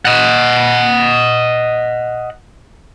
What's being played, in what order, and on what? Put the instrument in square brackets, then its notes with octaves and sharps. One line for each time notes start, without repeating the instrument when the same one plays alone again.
[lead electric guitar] D#5 F#5